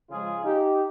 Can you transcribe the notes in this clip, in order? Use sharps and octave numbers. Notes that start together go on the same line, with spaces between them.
C#3 F3 G#3 F4 G#4
D#4 G4